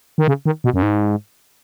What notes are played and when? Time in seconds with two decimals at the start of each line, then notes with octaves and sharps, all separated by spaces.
0.18 D#3
0.28 C#3
0.46 D#3
0.64 B2
0.74 F#2
0.83 G#2